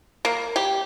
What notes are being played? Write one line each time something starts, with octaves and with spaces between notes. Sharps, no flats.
A#3
G4